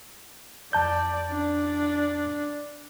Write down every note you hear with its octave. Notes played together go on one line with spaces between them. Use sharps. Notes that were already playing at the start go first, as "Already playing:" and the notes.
F2 D5 A5 G6
D4